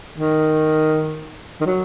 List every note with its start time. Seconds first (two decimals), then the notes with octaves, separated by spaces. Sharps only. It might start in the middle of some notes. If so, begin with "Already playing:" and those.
0.18 D#3
1.61 D#3
1.66 F#3